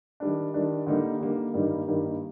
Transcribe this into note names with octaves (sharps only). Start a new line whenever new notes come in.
D#3 G3 D4
D#3 G3 D4
D3 G3 A#3 D#4
D3 G3 A#3 D#4
G2 D#3 G3 A#3 D#4
G2 D#3 G3 A#3 D#4